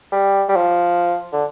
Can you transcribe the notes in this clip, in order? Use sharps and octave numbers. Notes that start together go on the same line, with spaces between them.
G3
G3
F3
D3